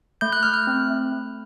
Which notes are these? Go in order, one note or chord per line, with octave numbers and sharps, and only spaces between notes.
A3 G6
F#6
A3 F6
F#6
C4
A3
A3